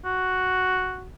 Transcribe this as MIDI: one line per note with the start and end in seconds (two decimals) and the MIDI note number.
0.05 1.07 66